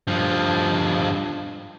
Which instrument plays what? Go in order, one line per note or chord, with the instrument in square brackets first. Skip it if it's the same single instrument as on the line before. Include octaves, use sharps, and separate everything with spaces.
[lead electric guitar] G2 F3